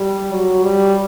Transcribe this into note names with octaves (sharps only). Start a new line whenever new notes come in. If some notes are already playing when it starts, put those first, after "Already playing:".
Already playing: G3
F#3
G3